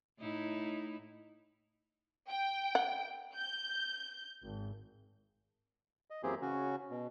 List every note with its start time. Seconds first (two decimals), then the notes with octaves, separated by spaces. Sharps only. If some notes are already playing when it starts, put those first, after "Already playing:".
0.19 A2 D#4 E4
2.28 G5
2.75 F#5
3.35 G6
4.43 G#1
6.10 D#5
6.23 F#2 E3 A#3 C4 G4 G#4
6.42 C#3 C#4 F#4
6.90 B2